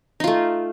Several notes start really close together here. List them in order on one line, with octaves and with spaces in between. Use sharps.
D#4 F4 A3